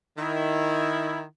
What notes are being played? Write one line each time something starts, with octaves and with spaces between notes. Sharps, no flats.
D#3 E4